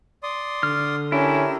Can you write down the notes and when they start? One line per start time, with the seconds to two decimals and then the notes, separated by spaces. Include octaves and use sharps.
0.23 D5 C6 D#6
0.63 D3 F6
1.12 C#4 D4 E4 G4 A#4